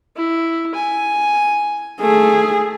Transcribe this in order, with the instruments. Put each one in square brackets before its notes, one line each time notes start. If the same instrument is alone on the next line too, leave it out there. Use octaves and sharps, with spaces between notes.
[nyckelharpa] E4
G#5
[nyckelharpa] A3 [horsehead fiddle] G#4